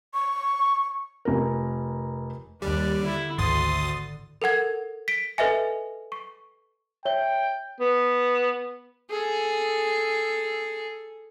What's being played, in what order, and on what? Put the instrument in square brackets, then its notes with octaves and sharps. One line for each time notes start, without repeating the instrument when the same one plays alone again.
[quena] C#6
[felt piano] F1 A#4
[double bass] D#2 [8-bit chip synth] G3 [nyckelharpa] D4 D5
[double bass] D3 [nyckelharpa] E4
[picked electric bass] G#1 [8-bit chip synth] D2 D#6 A6 [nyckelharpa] C6
[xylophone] A4 A#4 F#5 G#6
B6 D7
A4 B4 D#5 E5 G#5
C#6
[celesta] C#5 E5 G7 [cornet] G5
[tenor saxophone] B3
[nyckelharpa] G#4 A4